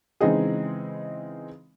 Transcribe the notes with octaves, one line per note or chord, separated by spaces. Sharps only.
C#3 E3 G#3 C4 D#4 G#4